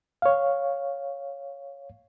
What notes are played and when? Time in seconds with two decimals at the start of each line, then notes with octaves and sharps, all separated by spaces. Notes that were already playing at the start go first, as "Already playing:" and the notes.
0.22 C#5 F5